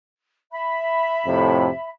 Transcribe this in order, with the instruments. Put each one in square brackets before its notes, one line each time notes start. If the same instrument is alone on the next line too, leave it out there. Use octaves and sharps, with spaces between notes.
[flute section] E5 B5
[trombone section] F2 A2 C3